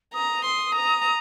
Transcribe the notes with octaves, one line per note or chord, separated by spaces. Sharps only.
A#5 D#6
C6
A#5